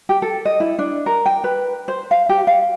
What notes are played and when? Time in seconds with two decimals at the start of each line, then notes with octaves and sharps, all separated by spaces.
0.09 G4
0.22 A4
0.45 D#5
0.60 E4
0.79 D4
1.06 A#4
1.26 G5
1.44 B4
1.88 C5
2.11 F5
2.29 G4
2.47 F5